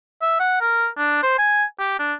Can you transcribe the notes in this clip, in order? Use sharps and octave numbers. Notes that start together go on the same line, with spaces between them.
E5
F#5
A#4
D4
C5
G#5
G4
D4